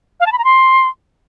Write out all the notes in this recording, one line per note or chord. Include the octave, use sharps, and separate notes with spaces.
F5
A5
B5
A#5
C6